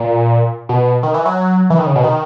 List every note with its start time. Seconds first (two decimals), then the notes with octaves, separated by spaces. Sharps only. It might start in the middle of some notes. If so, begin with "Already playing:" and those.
Already playing: A#2
0.69 B2
1.03 D#3
1.14 E3
1.25 F#3
1.70 E3
1.78 D#3
1.87 C#3
1.96 B2
2.04 D#3